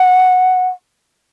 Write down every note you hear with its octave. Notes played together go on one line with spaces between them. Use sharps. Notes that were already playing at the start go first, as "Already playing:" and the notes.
Already playing: F#5